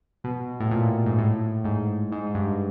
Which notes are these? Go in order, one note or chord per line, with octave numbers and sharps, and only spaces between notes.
B2
A2
A#2
G#2
A2
G#2
G#2
G#2
G2